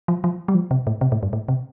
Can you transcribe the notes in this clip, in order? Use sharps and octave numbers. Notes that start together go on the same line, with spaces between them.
F3
F3
G3
F3
C3
A2
C3
A2
G2
A2
C3